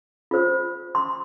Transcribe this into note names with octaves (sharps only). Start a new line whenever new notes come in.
F4 C5
C6